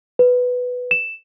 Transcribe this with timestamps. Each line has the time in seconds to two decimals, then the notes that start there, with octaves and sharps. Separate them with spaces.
0.19 B4
0.91 E7